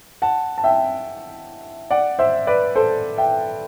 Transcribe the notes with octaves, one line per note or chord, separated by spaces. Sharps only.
F#5 A5
A5
E5 G5
D5 F#5
C5 E5
B4 D5
A4 C5
E5 G5